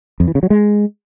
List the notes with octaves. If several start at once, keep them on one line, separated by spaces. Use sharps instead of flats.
F2
E3
C#3
F#3
G#3